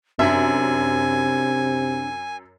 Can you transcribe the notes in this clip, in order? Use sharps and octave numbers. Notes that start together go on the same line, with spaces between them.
F#2 C3 D4 E5 G#5